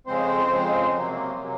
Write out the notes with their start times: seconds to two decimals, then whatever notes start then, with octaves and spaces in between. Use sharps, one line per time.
0.06 F2 C#3 G#3 C4 C5
0.51 F2 C#3 G#3
0.96 C3 F#3 A#3
1.40 C3 F#3 A#3